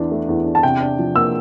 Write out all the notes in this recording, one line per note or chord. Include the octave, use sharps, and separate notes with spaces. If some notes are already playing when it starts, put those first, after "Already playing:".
Already playing: E2 E3 D4
A3
E2
D4
A5
C3 G5
D4
F3
A#3 E6